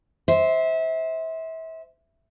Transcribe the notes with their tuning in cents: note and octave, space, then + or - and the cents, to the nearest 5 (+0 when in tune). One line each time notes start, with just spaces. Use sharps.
C5 +0 E5 -30